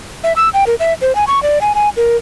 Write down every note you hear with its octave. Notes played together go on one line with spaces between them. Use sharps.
E5
E6
G5
A#4
E5
C5
G#5
C#6
D5
G#5
G#5
A#4